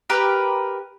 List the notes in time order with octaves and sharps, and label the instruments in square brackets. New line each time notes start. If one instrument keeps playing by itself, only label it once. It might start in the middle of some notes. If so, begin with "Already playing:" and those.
[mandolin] G4 A#4 B4